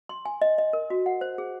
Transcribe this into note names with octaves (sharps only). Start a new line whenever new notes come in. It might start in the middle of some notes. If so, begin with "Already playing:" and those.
C6
G#5
D#5
D#5
A#4
F#4
F#5
C5
G#4